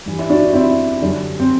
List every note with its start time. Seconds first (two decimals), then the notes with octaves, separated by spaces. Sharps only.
0.06 G2 E3 G3
0.19 E4
0.30 D4 F#4
0.54 C4 E4
1.02 F#2 D3 G3
1.40 C4